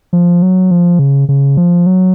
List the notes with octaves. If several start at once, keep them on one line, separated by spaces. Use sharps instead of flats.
F3
F#3
F3
C#3
C#3
F3
F#3